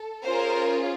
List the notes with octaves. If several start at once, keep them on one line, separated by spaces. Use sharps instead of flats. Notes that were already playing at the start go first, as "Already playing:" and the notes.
Already playing: A4
C#4 F4 G#4 A#4 C5